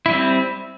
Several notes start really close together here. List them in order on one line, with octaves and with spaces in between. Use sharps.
E4 G3 C4